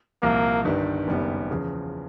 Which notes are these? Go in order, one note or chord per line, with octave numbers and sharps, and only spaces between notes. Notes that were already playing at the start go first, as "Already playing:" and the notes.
C2 A#2 F3 A#3
G1 G2 D#3 G3
F#1 F#2 D#3 G3 B3
E2 C#3 F3